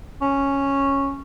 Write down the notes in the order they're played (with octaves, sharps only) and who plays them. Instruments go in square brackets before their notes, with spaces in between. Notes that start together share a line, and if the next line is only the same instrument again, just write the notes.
[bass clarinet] C#4